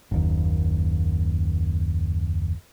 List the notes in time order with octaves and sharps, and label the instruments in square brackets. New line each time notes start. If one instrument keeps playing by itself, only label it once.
[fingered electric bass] F#1 D#2